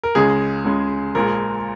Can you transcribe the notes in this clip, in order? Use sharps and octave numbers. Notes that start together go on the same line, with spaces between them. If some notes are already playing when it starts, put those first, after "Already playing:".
A#4
C#2 C#3 G#3 G#4
C#2 C#3 G#3
A#1 A#2 G#3 A#4